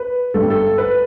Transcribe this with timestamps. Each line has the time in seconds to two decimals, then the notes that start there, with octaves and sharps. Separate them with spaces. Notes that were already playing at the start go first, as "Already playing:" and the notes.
Already playing: B4
0.34 G1 G2 G3 A4
0.50 A4
0.78 B4